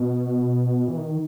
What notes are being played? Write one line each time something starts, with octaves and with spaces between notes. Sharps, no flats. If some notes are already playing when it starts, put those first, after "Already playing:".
Already playing: B2
E3
D#3